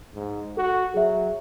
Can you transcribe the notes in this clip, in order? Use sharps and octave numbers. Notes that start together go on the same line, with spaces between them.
G#2
F#4 A4
F#3 G#4 E5